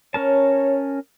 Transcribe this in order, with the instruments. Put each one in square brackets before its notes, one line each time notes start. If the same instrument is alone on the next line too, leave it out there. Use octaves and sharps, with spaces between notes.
[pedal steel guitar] C#4 A#4 A5 [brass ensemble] C#5